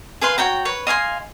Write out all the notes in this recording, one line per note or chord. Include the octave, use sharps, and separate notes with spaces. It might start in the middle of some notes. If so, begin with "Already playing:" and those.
G#4 B4 F5 C6
F#4 C#5 G5 A#5
B4 C#5
D#5 F5 G#5 C6